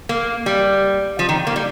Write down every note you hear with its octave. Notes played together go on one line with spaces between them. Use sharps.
A#3
G3
F3
D#3
A#3
G3